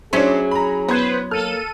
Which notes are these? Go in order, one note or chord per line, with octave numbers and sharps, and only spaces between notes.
F#3 C#4 D4 E4 G#4 C5
A#5 B5
B3 B4 C5 G#6
A#3 A4 F6 D#7